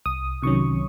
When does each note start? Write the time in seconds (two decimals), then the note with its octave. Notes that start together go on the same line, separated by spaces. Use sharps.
0.06 C2 D#6
0.42 C3 D#3 F#3 C#4 C#6